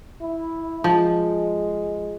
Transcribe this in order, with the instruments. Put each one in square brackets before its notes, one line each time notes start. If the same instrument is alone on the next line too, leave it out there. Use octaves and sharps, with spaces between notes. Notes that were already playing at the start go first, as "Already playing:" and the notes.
[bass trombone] E4
[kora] F3 [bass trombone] G#3